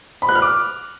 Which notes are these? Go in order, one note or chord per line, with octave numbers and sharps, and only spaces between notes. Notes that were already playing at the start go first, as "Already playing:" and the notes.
B5
F#6
F6
D6